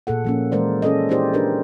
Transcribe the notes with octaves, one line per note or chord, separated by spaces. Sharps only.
A#2 G#4 A4 F#5
F3 A#3 C#4
E3 G#3 A#4 C5 D5
C#4 G#4 A4 D5 D#5
D#4 E4 G4 C5 D5
D4 G4 A#4 B4